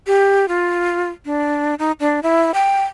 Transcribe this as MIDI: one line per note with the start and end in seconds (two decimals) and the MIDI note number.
0.07 0.48 67
0.48 1.09 65
1.26 1.75 62
1.79 1.92 63
2.00 2.20 62
2.23 2.51 64
2.54 2.83 79